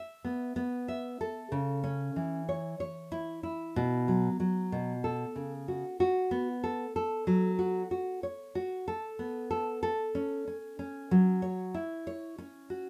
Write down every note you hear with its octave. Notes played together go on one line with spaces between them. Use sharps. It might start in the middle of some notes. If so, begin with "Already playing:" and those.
Already playing: E5
B3
B3
E5
A4
C#3
C#4
E3
C#5
C#5
E4
E4
B2
F#3
F#3
B2
A4
C#3
F#4
F#4
B3
A4
A4
F#3
F#4
F#4
C#5
F#4
A4
B3
A4
A4
C#4
C#4
C#4
F#3
C#5
E4
C#5
C#4
F#4